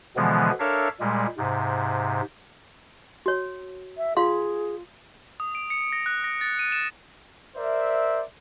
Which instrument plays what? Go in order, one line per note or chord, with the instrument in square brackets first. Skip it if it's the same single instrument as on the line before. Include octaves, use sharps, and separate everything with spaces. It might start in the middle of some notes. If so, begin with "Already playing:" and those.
[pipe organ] B2 D3 E3 F3 G#3 B3
D4 A4 A#4 C#5 E5 F5
A#2 G3 G#3
G#2 C3
[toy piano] F#4 C#5
[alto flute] E5
[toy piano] F4 F5 C6 [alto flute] G#4
[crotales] D#6
D7
C#7
A#6
F#6
A#6
A6
D#7
E7
[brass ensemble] A#4 C5 D5 E5